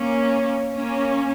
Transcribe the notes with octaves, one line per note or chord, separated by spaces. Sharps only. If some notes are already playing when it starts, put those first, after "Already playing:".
Already playing: A#3 C#4
A#3 C#4